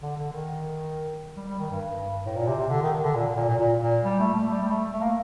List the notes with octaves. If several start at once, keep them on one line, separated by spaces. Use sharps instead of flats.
D3
D3
D#3
G3
G3
D#3
G2
A2
A#2
C3
C3
D3
D#3
D3
A#2
A#2
A#2
A#2
A#2
G3
A3
A3
G3
G3
A3
A3
A#3